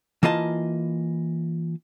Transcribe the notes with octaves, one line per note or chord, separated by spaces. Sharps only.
E3 A#3 F4 D#5 A5